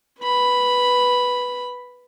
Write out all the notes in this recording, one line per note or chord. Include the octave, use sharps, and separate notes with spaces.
B4 B5